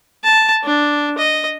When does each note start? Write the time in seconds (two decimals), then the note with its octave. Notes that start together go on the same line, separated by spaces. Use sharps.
0.23 A5
0.63 D4
1.18 D#5